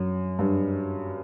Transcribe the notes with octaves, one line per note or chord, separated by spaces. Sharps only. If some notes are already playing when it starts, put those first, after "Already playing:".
Already playing: F#2
G2